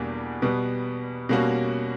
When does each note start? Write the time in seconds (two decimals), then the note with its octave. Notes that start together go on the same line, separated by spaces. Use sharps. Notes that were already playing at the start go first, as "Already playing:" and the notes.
Already playing: E2 B2 G3 A#3 D4
0.42 B2 G3 B3
1.29 B2 G3 A#3 C#4 F#4